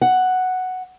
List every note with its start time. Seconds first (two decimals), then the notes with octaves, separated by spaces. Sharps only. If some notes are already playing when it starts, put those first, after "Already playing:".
0.02 F#5